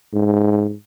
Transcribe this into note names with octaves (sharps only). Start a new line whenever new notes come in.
G#2